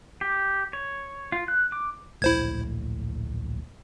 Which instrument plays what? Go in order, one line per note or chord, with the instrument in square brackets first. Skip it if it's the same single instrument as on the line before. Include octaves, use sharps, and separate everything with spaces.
[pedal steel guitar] G4
C#5
F4
F#6
D6
[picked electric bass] D1 A#1 A2 [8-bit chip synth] E4 C5 G#6